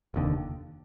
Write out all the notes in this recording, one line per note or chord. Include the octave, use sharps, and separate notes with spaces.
F1 D#2 D3